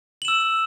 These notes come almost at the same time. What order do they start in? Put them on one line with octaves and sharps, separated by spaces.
F#7 E7 E6